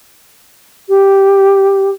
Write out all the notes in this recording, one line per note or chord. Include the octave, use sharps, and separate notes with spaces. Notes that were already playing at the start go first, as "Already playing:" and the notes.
G4